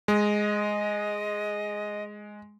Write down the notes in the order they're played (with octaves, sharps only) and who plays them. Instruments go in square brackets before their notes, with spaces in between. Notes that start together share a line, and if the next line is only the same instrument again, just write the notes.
[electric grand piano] G#3 [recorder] D#5